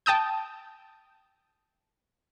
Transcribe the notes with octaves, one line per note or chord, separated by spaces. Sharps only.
G5 A5 D#6 G6